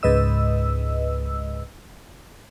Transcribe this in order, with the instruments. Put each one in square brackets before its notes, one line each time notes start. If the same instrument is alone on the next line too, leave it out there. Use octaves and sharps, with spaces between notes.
[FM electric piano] C#2 G#2 B4 D#5 E6